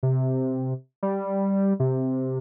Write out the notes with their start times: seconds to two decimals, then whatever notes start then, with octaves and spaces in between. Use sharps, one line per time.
0.03 C3
1.03 G3
1.80 C3